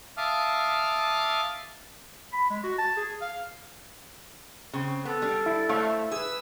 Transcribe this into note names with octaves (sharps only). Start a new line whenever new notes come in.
E5 F5 A5 D6 D#6 F6
B5
G#3
F#4
A5
G#4
F5
C#3 C4
B3 A4
G3 D4
E4
A3 C5 C#5 F5
G#4 B4 E6